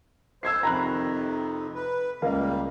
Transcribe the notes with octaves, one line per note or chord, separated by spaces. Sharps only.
C5 E6 G#6 C7
F2 C3 D#3 A#5 B5 F#6
B4
C#2 G3 A#3 A#4 F5